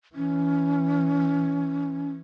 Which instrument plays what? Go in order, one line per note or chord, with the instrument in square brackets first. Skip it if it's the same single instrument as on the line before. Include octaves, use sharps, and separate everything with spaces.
[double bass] E3 [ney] C#4